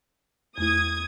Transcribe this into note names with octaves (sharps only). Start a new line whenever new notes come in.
E2 A3 E4 D#6 G#6